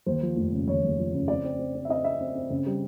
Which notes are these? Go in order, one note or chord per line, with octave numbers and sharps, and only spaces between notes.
D#2 C5
F3
F1
C#3
D#2 C#5
D#2
F3
C#3
C4 D5
C4
C4
C4
E5
C4 D#5
C4 E5
C4
C4
C#3
G3